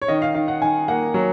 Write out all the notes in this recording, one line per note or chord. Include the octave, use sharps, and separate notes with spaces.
C#5
D#3 D#5
F5
D#3 F5
F#5
D#3 G#5
A#3 F#5
F#3